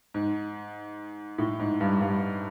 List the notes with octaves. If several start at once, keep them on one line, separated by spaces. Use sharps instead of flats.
G#2
A2
G#2
G2
G2